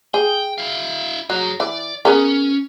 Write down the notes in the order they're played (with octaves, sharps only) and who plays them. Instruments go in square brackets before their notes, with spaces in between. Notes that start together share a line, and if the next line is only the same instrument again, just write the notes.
[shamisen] G#4 [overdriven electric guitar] G5
[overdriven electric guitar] E4 F5
[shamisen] F#3 [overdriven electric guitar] G#4 A#5
[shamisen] E3 [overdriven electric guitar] D5
[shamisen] B3 G#4 A#4 [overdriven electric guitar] C#4